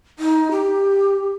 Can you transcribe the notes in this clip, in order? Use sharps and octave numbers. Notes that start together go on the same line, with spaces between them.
D#4
G4